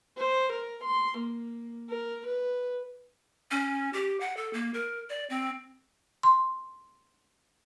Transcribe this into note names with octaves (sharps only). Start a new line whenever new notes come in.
C5
A#4
C6
A#3
A#4
B4
C#4
G4
F#5
A4
A#3
A#4
D5
C4
C6